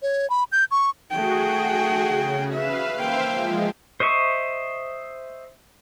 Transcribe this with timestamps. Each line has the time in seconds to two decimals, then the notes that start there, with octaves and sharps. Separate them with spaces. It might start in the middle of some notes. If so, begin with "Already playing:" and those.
0.02 C#5
0.30 B5
0.52 G6
0.71 C#6
1.11 A3 F#4 G#4 G5
2.07 C#3
2.54 B4 E5 F5
2.96 A#3 C5 E5 F5 G5
3.33 F3 G#3
4.00 C5 D#5 E5 C#6